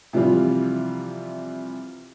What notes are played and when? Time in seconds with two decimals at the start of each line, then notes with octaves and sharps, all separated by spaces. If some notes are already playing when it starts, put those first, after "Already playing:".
0.13 C3 E3 F3 G3 F4